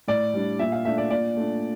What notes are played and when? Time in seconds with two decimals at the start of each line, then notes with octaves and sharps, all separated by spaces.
0.08 A2 D5
0.34 G3 D4
0.59 A#2 E5
0.72 F5
0.85 A3 D4 E5
0.98 D5
1.10 A#2 D5
1.36 A3 D4